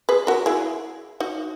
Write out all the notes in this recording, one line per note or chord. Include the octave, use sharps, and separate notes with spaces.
G#4 B4
F#4 A#4
E4 G#4
D#4 F#4